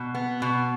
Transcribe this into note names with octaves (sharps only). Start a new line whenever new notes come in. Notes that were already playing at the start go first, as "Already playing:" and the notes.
Already playing: B2
B3
B2